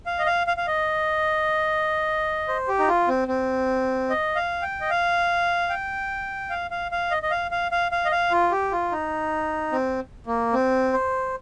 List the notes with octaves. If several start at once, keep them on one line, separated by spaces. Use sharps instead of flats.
F5
D#5
F5
F5
F5
D#5
C5
G4
D#4
F4
C4
C4
D#5
F5
G5
D#5
F5
G5
F5
F5
F5
D#5
D#5
F5
F5
F5
F5
D#5
F5
F4
G4
F4
D#4
C4
A#3
C4
C5